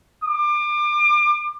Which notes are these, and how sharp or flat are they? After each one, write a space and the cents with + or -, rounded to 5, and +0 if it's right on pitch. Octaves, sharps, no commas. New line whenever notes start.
D6 +30